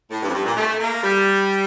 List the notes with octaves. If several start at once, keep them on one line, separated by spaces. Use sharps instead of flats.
A2
G2
F2
G2
A#2
A3
A#3
G3